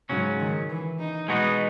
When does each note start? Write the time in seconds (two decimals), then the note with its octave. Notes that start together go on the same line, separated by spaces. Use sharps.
0.10 G#2 C#3 F#3 C#4
0.39 D#3
0.69 E3
0.99 D#4
1.28 B2 G#3 B3 D#4 F#4